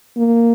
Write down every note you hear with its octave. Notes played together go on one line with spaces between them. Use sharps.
A#3